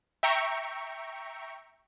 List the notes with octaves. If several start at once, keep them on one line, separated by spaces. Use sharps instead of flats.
E5 G5 A#5 C#6